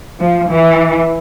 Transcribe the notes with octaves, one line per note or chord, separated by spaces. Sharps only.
F3
E3